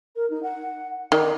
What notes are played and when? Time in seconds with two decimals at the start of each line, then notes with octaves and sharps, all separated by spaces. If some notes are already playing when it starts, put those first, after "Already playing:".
0.16 A#4
0.30 D#4
0.43 F#5
1.12 D#3 D5